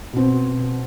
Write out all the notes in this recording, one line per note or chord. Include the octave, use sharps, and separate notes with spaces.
B2 C4